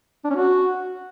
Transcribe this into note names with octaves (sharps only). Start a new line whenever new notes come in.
D4
C#4
F#4